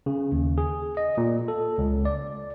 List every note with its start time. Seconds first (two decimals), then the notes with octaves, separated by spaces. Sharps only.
0.06 C#3
0.32 D#2
0.58 G#4
0.97 D#5
1.17 A#2
1.48 A4
1.78 C#2
2.05 D5